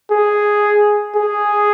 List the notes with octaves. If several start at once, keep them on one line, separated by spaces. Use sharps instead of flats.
G#4
G#4